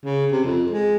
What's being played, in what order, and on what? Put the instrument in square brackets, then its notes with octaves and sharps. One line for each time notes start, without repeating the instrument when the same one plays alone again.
[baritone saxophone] C#3
C3
F2
G#3